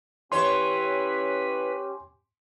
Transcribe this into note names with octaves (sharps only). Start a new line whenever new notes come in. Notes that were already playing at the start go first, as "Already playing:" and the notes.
E3 C#4 G4 B4 C#5 C6